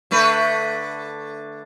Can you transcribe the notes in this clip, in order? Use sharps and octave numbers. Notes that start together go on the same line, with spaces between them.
D3 A3 B4